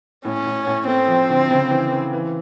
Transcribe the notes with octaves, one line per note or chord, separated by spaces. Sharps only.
A2 C#4
A2
A2
A3 C4
F3
D3
C#3
E3
E3
E3